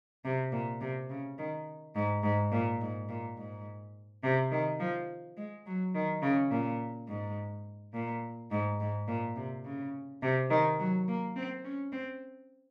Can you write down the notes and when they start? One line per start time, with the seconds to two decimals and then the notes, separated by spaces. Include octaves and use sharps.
0.25 C3
0.52 A#2
0.81 C3
1.10 C#3
1.38 D#3
1.96 G#2
2.24 G#2
2.52 A#2
2.81 G#2
3.09 A#2
3.38 G#2
4.23 C3
4.51 D#3
4.80 F3
5.37 G#3
5.66 F#3
5.95 D#3
6.22 C#3
6.51 A#2
7.08 G#2
7.94 A#2
8.51 G#2
8.80 G#2
9.08 A#2
9.36 C3
9.65 C#3
10.22 C3
10.50 D#3
10.79 F#3
11.08 A#3
11.36 C4
11.64 C#4
11.92 C4